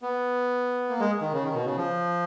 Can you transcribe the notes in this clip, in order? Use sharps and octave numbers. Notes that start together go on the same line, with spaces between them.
B3
A#3
G#3
D#3
C#3
D#3
B2
C#3
F3